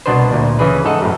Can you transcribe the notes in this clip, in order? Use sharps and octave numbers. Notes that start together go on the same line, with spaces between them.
C2 B2 B3 D4 B4 C5
D2 A#2
C#3 E3 G#4 B4
G#2 A4 D#5 F#5
F#2 A2